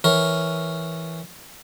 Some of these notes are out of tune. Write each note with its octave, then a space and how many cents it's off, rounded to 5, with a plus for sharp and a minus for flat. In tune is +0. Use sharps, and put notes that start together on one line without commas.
E3 +0 A#4 +0 C#5 +0